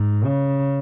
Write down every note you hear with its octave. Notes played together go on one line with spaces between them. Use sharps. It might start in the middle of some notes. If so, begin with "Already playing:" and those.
Already playing: G#2
C#3